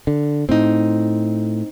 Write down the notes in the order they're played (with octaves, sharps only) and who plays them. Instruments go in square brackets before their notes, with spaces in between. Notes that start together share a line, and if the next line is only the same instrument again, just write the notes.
[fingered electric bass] D3
[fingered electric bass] A2 [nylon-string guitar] C4 D#4